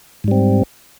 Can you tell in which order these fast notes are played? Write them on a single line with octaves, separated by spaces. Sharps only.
G#2 G3 C4